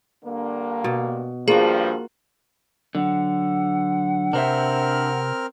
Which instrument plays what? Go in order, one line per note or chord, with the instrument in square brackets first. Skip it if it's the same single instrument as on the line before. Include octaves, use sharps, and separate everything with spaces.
[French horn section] G2 D3 A#3
[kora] B2
[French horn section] G2 F3 [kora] A#3 F4 F#4 [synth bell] G#4
[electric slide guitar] D3 [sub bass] F#3 [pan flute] F#5
[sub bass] C3 [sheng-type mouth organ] C4 A#4 F6 [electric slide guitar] D4 C5 E5